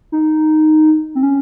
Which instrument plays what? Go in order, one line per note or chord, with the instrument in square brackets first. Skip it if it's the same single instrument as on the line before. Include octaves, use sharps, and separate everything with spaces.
[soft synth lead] D#4
C4
C#4